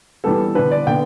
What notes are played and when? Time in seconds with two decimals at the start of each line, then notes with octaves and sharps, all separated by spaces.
0.24 E3 G3 B3 A4
0.55 D3 B3 D4 B4
0.71 D5
0.87 D3 B3 G5